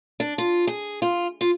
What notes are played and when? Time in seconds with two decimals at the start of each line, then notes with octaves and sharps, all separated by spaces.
0.20 D4
0.38 F4
0.67 G#4
1.02 F4
1.41 F4